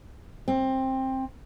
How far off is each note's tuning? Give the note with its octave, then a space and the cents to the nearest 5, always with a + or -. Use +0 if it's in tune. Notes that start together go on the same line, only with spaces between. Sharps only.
C4 +15